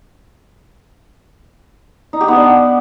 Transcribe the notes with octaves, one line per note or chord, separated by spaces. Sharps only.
D#4
G4
B3
D4